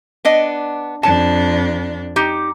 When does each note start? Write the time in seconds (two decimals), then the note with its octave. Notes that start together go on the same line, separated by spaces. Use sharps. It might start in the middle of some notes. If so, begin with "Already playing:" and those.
0.25 B3 D4 D#5
1.03 F2 D4 A5
2.16 D#4 G4